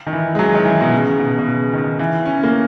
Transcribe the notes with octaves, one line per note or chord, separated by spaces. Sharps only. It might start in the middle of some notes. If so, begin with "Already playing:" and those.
D#3
E3
G#3
F#3
D#3
E3
B2
C#3
B2
B2
C#3
D#3
E3
C#4
A#3